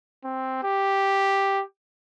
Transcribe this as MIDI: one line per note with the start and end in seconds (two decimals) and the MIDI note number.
0.24 0.62 60
0.63 1.63 67